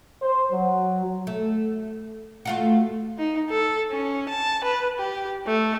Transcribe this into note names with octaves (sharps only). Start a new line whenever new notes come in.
C5
F#3
A3
A3 F4 F#4
D#4
A4
C#4
A5
B4
G4
A3